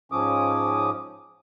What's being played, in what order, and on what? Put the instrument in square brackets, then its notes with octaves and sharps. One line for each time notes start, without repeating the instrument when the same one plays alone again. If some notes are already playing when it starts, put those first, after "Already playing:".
[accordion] G#2 F3 C#4 D6 D#6